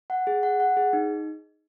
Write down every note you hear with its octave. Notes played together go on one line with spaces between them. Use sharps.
F#5
G#4
F#5
F#5
G#4
D#4